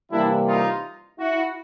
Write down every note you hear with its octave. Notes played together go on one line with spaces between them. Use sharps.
C3 E3 G3 A#3 D4 E4
D#4 F4
E4 F#4